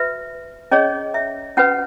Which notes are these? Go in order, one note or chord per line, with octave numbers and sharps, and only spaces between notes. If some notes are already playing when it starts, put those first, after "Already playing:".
Already playing: F#4 B4 E5
C#4 G#4 C#5 D#5
E5
C#4 F#4 B4 F#5